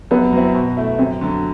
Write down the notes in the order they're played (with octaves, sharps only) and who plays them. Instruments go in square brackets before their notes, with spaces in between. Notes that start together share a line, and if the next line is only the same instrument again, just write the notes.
[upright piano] F#2 [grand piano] B3
[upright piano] F#3 C4 E4
B2
A3 E4
[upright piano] F#2 [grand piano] C4
[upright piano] D3 F#3